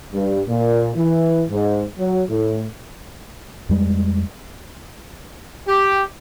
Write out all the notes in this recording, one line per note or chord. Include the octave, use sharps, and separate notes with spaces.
G2
A#2
E3
G#2
F#3
A2
F2 G3 G#3
G4